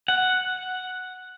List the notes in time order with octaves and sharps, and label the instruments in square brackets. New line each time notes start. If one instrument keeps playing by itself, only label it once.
[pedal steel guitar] F#5